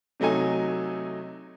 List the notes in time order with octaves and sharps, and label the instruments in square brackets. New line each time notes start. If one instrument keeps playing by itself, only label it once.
[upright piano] C3 F#3 A3 D#4 G#5